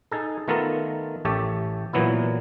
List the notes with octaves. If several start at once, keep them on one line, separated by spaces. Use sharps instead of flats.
D#4 G#4 A4
D#3 A3 B3 F4 A4 A#4
A1 A3 G4 A4 C#5
A#2 E3 F#3 B3 E4